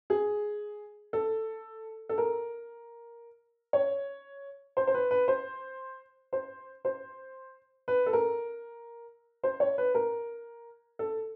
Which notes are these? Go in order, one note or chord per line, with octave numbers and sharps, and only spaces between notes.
G#4
A4
A4
A#4
C#5
C5
C5
B4
B4
C5
C5
C5
B4
A4
A#4
C5
C#5
B4
A#4
A4